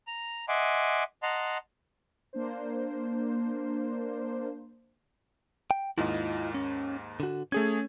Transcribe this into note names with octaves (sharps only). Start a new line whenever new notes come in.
A#5
D#5 E5 F#5 G#5 C6 D6
D#5 F#5 A5 A#5 C6
A#3 D4 C5
G5
D#2 G#2 E4 F4 D#5
C#4
D3 F#4
A3 C#4 G#4 G#6